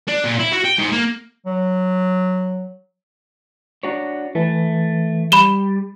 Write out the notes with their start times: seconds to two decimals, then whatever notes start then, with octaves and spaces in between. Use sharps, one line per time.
0.08 D4
0.24 A#2
0.39 E4
0.52 F#4
0.64 G5
0.78 G#2
0.92 A#3
1.46 F#3
3.83 D4 F#4 C#5
4.35 E3 A3
5.32 G3 B5 E7 G7